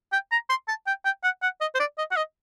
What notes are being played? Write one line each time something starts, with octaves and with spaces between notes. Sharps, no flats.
G5
A#5
C6
A5
G5
G5
F#5
F#5
D#5
C5
D5
D#5
F#5
D#5